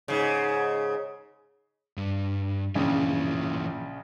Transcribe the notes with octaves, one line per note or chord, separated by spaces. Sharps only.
G#2 C#3
G2
A#1 C#3 E3 F3 A#3